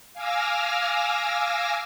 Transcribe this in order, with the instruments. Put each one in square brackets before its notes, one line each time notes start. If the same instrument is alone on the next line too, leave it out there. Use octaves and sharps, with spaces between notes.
[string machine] F5 G#5 D6 E6 F6 A#6